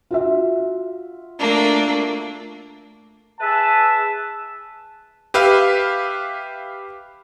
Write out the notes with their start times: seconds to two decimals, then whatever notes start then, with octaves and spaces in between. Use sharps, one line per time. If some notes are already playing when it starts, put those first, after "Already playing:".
0.11 F4 F#4 E5
1.38 A3 A#3 D4
3.40 G#4 B4 E5 A5
5.34 G4 B4 E5 F5